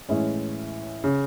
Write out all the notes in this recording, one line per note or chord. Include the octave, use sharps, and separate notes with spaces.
A2 E3 G#3 C#4 E4
C#3